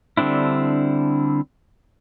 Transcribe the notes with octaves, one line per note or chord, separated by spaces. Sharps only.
D3 G3 C4 D4 E4